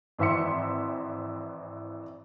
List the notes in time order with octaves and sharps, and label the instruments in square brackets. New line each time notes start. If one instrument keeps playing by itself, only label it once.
[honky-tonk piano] G#1 E3 C4 E5 C6 C#7